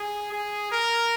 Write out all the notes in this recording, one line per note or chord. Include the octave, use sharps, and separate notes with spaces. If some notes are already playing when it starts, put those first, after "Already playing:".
Already playing: G#4
G#4
A#4